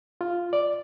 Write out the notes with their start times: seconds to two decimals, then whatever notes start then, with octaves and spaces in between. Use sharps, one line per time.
0.21 F4
0.53 D5